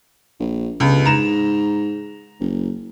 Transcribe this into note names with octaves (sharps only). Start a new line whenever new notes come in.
A#1
G1 C#2
G#2 A#5 E7
F#1